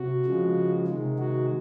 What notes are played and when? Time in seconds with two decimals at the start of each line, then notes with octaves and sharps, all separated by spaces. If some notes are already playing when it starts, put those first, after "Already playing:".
Already playing: C3 F#4
0.25 C#3 F3 G#3
0.87 C3 D#3 G#3
1.18 F#4